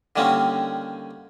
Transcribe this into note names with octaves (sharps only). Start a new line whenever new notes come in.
D3 D#3 G3 A#3 C4 C#4